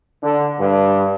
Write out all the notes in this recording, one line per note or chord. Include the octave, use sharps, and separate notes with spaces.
D3
G2